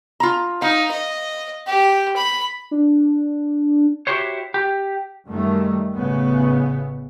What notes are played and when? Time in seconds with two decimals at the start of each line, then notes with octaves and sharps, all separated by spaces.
0.20 F4 A#5
0.62 D#4 F5
0.92 D#5
1.67 G4
2.17 B5
2.71 D4
4.07 E4 F#4 G4 C5 C#5
4.54 G4
5.28 F#2 D#3 G3 A3
5.96 A1 A2 C#3 B3